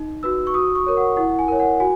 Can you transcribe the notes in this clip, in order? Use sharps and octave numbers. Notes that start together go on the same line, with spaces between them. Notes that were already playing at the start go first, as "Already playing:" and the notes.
Already playing: D#4
F#4 B4 E6
C#6
F#4 D#6
C#6
A#4 C#5
F#5
E4 F#5
G#5
A#4 C#5
F#5
F#4 G#5